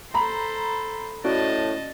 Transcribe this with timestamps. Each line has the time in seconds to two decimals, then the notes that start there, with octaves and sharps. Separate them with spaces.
0.14 A4 C5 A#5 B5
1.24 A2 C#4 F#4 D5 D#5 A5